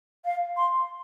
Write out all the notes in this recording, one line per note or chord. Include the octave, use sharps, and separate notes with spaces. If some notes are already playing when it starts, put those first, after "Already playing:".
F5
C6